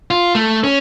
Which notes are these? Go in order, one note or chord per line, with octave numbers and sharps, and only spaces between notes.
F4
A3
C#4